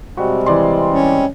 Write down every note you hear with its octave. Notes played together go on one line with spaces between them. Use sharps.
C3 G3 G#3 C4 F#4
E3 D5 C6
C#4